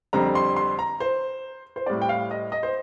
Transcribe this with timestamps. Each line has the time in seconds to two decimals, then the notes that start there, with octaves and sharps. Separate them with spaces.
0.13 F2 D3 G3 C4 A#5
0.35 C6
0.56 C6
0.79 A#5
1.00 C5
1.76 C5
1.86 A2 G3 C4 D5
2.02 G5
2.09 F5
2.31 D#5
2.52 D#5
2.63 C5